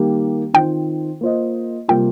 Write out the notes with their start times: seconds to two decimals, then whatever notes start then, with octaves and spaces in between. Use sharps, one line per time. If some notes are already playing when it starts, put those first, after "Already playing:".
Already playing: D#3 G3 A#3 G4
0.54 D#3 C4 F4 C5 G5
1.21 A#3 F4 C5 D#5
1.88 C3 G3 A#3 F4 G5